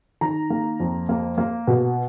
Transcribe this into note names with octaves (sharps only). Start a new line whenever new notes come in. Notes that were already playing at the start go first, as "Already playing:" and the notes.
D#3 A#5
A#3
F2
A#3
A#3
B2